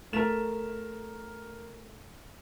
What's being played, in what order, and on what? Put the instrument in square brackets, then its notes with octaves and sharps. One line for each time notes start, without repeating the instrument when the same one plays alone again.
[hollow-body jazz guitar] A3 [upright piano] A#4 E7